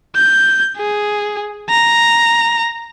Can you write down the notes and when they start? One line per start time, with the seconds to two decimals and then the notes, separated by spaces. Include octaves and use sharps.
0.16 G6
0.77 G#4
1.70 A#5